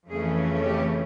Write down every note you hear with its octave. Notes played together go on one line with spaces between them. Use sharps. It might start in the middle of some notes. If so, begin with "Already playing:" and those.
F2 C#3 E3 A3 C#4 G#4
G4